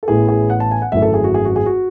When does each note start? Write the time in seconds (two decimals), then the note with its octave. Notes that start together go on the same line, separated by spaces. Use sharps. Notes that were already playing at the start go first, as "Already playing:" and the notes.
0.03 A4
0.08 A1 A2 E3 B3 G#4
0.28 G#4
0.50 F#5
0.60 A5
0.71 G#5
0.82 F#5
0.92 G#1 F#2 E3 A3 E5
1.02 A4
1.14 G#4
1.24 F#4
1.34 G#4
1.45 F#4
1.56 G#4
1.66 F#4